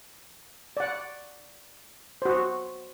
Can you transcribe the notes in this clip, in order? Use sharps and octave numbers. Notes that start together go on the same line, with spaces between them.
D5 F#5
F#4 C5